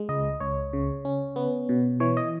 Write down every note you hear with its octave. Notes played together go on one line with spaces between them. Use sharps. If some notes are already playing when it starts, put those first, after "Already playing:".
Already playing: G#3
C#2 D#5
C#2 C#5
C#3
C#4
B3
B2
E3 C#5
D#5